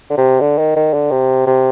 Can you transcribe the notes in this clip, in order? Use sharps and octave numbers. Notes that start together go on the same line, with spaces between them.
D3
C3
D3
D#3
D#3
D3
C3
C3